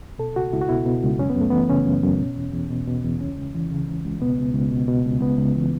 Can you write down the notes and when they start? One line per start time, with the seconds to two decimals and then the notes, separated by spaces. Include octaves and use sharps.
0.19 B2 A4
0.36 C#2 F#4
0.53 C#2 E4
0.62 F#4
0.69 B2 E4
0.86 B2
1.03 C#2
1.19 F#2 C#4
1.30 B3
1.36 F#2 A3
1.51 E3 B3
1.69 C#3 C#4
1.86 F#2
2.03 F#2
2.20 B2
2.36 E2
2.54 E2
2.70 B2
2.87 B2
3.04 E2
3.21 C#2 C#4
3.37 C#2
3.55 E3
3.71 C#3
3.88 C#2
4.05 C#2
4.21 B2 B3
4.38 C#2
4.54 C#2
4.71 B2
4.88 B2
5.05 C#2
5.21 C#2 B3
5.38 C#2
5.55 E3